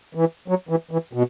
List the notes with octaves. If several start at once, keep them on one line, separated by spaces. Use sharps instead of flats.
E3
F#3
E3
E3
B2